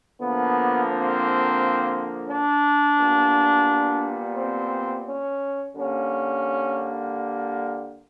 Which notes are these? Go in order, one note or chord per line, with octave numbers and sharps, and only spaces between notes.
D3 F3 A#3 B3
C4
D4
A#2 G3 B3
C4
C#4
D3 G3 A#3 C#4